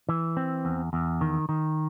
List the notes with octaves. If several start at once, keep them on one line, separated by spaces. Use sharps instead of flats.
E3
C4
E2
E2
D#3
D#3